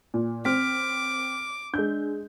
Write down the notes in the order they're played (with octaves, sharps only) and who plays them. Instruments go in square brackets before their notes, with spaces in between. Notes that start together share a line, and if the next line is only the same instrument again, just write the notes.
[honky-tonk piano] A#2
[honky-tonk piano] C4 [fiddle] D6 [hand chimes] F6 B6
[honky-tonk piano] G#3 G6 [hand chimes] D4